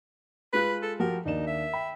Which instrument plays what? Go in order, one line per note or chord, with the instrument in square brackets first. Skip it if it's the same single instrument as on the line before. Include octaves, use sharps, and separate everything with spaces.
[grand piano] G#3 F4 F#6 [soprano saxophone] B4
[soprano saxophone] A4
[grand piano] F3 F#4 G4 [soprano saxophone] A#4
[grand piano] D#2 D4 E7 [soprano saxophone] D#4
[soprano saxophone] E5
[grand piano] G5 B5